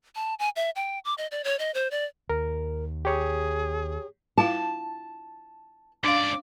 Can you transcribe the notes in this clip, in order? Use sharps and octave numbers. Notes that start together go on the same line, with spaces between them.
A5
G#5
E5
G5
D6
D#5
D5
C#5
D#5
C5
D5
D#2 A#4
G4 G#4 C#5
E4 F4 F5 A5
C#2 D4 D5 F5 D6